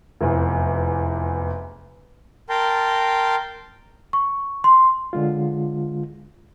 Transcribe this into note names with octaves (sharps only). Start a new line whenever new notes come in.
F1 E2
A#4 G5 A5 C6
C#6
C6
D3 G#3 F4